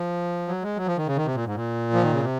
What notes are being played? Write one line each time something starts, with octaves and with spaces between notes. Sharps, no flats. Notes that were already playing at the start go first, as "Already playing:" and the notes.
Already playing: F3
F#3
G#3
F#3
F3
D#3
C#3
D#3
C3
A#2
G#2
A#2
F3
D#3
C#3
C3